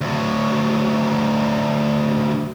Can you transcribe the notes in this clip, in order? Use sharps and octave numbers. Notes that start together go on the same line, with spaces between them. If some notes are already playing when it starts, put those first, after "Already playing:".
D2 F#3